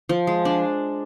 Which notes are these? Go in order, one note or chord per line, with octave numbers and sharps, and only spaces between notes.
F3
G#3
D4